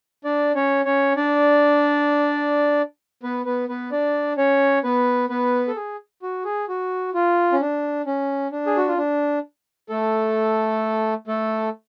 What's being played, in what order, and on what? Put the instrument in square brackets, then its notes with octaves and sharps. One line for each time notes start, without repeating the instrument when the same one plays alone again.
[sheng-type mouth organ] D4 D5
C#4 C#5
C#4 C#5
D4 D5
B3 B4
B3 B4
B3 B4
D4 D5
C#4 C#5
B3 B4
B3 B4
A4
G#4
F#4
G#4
F#4
F4
C#4
D4
C#4
D4
G#4
F#4
F4
D4
A3 A4
A3 A4